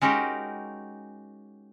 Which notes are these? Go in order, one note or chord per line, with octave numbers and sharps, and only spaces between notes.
G#3 C#4 D#4 F#4 G4 A#4